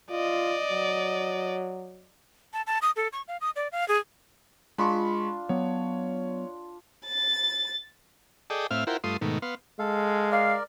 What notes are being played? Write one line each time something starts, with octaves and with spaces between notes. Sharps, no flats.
F4 D5 D#5
F#3
A5
A5
D#6
A4
C#6
F5
D#6
D5
F5
G#4
G#3 D4 F4 B5 C#6
F#3 B3 C#5
A6
G#4 A4 D5 D#5 G5
A2 C4 E5 F5 F6
E4 F4 A#4 C5 F#5 G5
G2 A3 F4 C6 D#6
G#2 B2 D#3 A3
B3 F5 C6
G#3 A4 F5
A#4 D5 F5